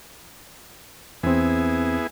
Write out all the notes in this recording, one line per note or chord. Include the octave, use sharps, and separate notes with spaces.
E2 B3 C4 E4 G#4